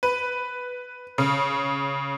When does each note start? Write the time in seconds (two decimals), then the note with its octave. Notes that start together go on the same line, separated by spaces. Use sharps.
0.03 B4
1.18 C#3